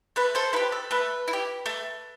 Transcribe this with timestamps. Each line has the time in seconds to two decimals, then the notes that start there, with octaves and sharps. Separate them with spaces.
0.16 A3 B4
0.35 A4 C5
0.53 E4 G4 B4
0.72 A4
0.91 A3 B4
1.28 E4
1.33 G4
1.66 A3